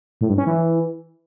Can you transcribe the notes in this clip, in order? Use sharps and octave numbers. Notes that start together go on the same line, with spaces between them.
A2
G2
C#4
E3